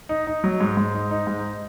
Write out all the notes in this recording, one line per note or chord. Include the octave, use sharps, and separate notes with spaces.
D#4
D#4
F#3
G#2
G#2
D#4
D#4
G#2